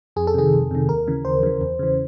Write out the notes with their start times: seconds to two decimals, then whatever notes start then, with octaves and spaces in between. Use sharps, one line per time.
0.16 F2 G#4
0.27 A4
0.34 C3 D#3 G#4
0.53 F2
0.71 C3 D#3
0.89 D#2 A#4
1.08 C#3 E3
1.25 D#2 C5
1.43 C#3 E3
1.61 E2
1.79 C#3 E3